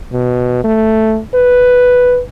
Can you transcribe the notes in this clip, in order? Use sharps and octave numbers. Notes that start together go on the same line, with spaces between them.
B2
A3
B4